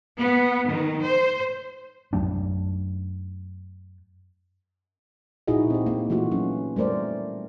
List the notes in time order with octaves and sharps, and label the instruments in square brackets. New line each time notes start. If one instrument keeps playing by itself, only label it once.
[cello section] B3
D#3
C5
[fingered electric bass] F#2 F#3 A3 D4
[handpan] A#2 D#4 E4 F#4 G#4 D#5
C4 G4
A#3
E3 A3 F4 F#4
F#3 C#4
G3 A3 A#4 C5 D5